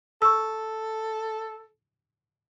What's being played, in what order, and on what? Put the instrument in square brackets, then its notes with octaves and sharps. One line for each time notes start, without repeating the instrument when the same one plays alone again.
[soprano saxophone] A4 [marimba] C#6 E6